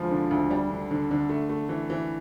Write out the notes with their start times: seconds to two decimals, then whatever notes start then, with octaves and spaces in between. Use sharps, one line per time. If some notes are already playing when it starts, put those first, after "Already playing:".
Already playing: D2 F3 G#3
0.11 D3
0.31 D2
0.50 G3
0.70 D3
0.91 D3
1.11 D3
1.29 A3
1.49 A3
1.69 E3
1.90 E3